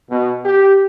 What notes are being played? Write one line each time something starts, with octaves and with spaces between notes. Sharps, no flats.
B2
G4